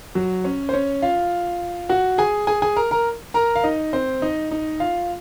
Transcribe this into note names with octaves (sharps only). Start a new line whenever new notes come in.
F#3 F#4
C#4 C#5
C5
C#4 C#5
F4 F5
F#4 F#5
G#4 G#5
G#4 G#5
G#4 G#5
A#4 A#5
A#4 A#5
A#4 A#5
F5
D#4 D#5
C4 C5
D#4 D#5
D#4 D#5
F4 F5